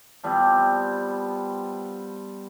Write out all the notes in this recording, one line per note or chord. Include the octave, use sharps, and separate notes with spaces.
F3 G3 B3 C4